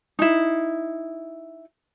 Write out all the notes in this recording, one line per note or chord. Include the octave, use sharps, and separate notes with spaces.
D#4 E4